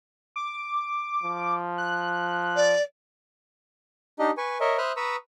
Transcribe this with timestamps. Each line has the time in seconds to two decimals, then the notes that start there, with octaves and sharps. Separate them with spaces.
0.36 D6
1.23 F3
1.78 F#6
2.56 D5
4.19 D4 D#4 G4 D#5
4.37 B4 G#5 C#6
4.60 A#4 C#5 D#5 E5
4.78 C5 E5 B5 D#6 F6 F#6
4.96 B4 A#5 B5 C#6 D#6 E6